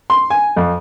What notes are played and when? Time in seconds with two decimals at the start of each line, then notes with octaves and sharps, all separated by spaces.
0.10 C6
0.30 G#5
0.57 F2